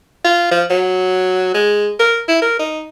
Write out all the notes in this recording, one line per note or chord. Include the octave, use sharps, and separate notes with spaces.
F4
F3
F#3
G#3
A#4
E4
A#4
D#4